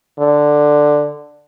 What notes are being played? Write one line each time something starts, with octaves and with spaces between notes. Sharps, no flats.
D3